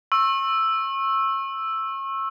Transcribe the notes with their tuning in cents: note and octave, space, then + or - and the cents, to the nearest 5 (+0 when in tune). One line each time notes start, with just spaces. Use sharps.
C#6 -35 E6 +0